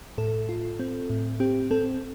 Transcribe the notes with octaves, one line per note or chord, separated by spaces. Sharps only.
A2 A4
F4
C4
A2
C4 G4
C4 A4